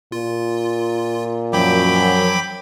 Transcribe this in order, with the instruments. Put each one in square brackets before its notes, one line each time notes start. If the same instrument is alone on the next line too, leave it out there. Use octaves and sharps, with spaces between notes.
[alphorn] A#2 [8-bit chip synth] F4
[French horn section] F#2 [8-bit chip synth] F3 F#3 [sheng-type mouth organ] G5 B5 D6